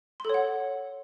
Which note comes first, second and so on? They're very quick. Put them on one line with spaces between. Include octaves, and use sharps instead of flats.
C6 A4 C#5 F#5